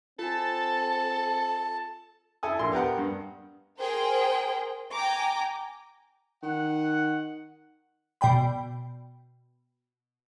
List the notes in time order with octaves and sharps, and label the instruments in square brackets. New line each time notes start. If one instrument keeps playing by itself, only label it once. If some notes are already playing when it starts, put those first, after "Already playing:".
[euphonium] C4 [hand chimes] F4 G#5 [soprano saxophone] A4 [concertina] A5
[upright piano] E4 A4 G#5 D#6
A#1 A#2 C6
B3 G4 A#4 F#5
G2
[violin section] G#4 A#4 C5 G5
G5 G#5 A#5 D6
[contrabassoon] D#3 [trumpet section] F#5
[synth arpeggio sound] B2 D5 G5 B5